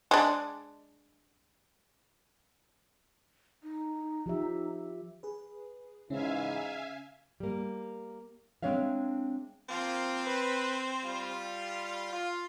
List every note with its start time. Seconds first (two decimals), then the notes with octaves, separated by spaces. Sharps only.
0.11 G#3 D4
3.63 D#4
4.26 F3 G4 E5
5.23 G#4 B4
6.10 G#2 C#3 E3 C#4 E5 F5 G#5
7.40 G3 A#3
8.63 G#3 C4 D4 C#5 E5 F5
9.69 F3 A#3 C4 F4
10.25 B4
11.03 G3 F4
12.12 F4